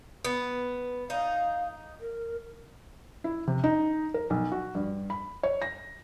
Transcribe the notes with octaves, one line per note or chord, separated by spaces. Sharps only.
B3
D#4 F5
A#4
E4
C3
D#4
A#4
B1
F#4
G2
B5
C#5
A#6